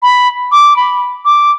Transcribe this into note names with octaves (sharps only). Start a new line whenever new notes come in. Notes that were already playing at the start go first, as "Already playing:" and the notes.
B5
D6
B5
D6